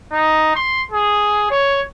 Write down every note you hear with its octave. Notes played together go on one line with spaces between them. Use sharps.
D#4
C6
G#4
C#5